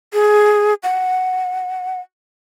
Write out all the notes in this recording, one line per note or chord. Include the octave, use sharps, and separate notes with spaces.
G#4
F#5